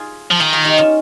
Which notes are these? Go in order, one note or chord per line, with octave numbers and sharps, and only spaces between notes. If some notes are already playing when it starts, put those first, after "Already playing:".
Already playing: F4 G#4
F3
D#3 F4 G#4
F4 G#4
D#4 G4
C#4 F4